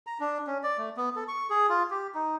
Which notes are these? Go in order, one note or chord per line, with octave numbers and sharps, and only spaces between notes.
A#5
D4
C#4
D5
A3
B3
A4
C#6
G#4
F4
G4
D#4